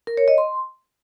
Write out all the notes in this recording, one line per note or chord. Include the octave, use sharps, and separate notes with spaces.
A#4
C#5
D#5
C6